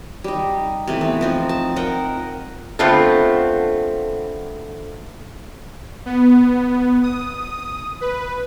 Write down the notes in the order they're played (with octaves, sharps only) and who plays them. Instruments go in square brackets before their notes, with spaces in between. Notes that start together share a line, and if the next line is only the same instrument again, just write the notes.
[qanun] G3 D#4
C3 E3 A3
B3
F3 C4 D#4
A5
A#4 D#5 F#5 G5
[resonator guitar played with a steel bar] D3 A3 B3 C4 F4 A4
[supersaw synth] B3
D#6
B4